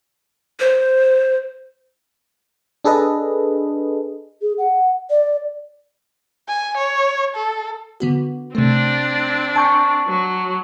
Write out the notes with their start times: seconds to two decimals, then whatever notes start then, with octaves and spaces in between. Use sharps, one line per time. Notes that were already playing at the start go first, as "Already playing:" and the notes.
0.60 C5
2.84 D4 G#4 A4 B4 D#5
4.42 G#4
4.58 F#5
5.10 D5
6.48 G#5
6.77 C#5
7.36 A4
8.00 D3 B3 F#4
8.55 C3 A3 C4 D4
9.56 G#5 A5 C#6 G6 C#7
10.07 F#3